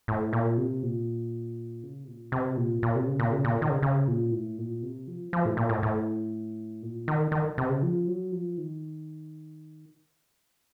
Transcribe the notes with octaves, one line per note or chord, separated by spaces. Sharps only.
A2
A#2
C3
A#2
C#3
C3
A#2
C3
A#2
A#2
C3
C#3
A#2
C#3
A#2
D#3
C#3
C#3
A#2
A2
A#2
C3
F3
F3
A2
A#2
A2
A2
A#2
D#3
D#3
C3
C#3
F3
F#3
F3
D#3